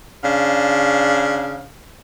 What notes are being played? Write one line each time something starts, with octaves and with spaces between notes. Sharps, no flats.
C#3 D4 F5